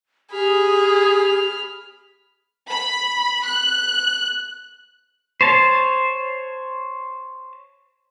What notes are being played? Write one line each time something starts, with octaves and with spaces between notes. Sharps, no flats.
G4 G#4 B5 F6
B5
F#6
C5 C#5 A5